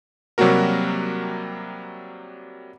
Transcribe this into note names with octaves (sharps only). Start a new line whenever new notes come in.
C3 F#3 G3 A#3 F#4 A#4